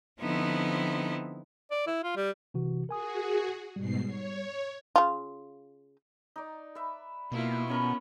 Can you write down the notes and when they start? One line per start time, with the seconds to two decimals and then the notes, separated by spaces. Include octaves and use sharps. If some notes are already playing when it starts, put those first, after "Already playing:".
0.20 D3 F3 B3 C4 D#4 E4
1.71 D5
1.87 E4
2.03 F4
2.16 G3
2.54 C3 E3 F#4
2.89 F#4 G#4 A#4 G#5 D#6
3.76 G#2 B2 G3 C7
4.05 C#5
4.96 C#3 F4
6.36 D#4 D5
6.75 B4 E5
7.32 B2 A#3 E4 F4
7.68 B3 C#4 A#4 C#5 B5